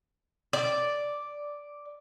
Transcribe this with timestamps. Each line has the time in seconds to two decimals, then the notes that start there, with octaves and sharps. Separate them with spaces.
0.53 D5